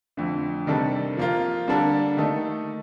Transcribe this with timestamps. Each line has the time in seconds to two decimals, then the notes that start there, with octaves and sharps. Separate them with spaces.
0.17 F2 D3 A3
0.67 C3 D#3 G3 D4 A4
1.17 F3 A#3 F4
1.68 D3 G3 A#3 D4 A4
2.17 D#3 A3 D#4 A4